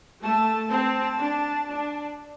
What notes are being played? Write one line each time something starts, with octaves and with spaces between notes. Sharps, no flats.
A3 A5
C4 A5
D4
D4